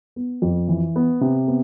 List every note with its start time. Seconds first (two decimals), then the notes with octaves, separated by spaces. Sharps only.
0.16 B3
0.42 F2
0.68 E3
0.96 B3
1.21 C3
1.48 B3